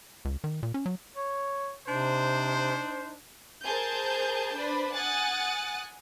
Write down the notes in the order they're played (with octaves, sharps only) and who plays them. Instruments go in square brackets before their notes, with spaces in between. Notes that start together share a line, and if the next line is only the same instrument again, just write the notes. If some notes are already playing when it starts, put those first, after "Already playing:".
[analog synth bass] C#2
D#3
A#2
C#4
F#3
[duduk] C#5
[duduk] C3 [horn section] D4 D#4 C5
[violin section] G#4 A#4 C5 G#5 A5 G6
D4 B4 C5 D5 B5
F#5 G#5 D#6 F#6 A6